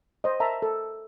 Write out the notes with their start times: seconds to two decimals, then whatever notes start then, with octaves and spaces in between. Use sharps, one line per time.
0.24 C5 D#5
0.40 A#4 E5 A5 A#5
0.62 A4